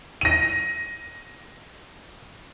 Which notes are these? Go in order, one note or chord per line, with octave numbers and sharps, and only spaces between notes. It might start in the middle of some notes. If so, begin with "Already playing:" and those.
A#6 D#7